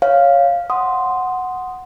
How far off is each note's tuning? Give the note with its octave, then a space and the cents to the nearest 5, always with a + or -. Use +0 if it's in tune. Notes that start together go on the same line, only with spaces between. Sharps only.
C#5 +0 F5 +0
F#5 -5 C6 -5 D#6 +0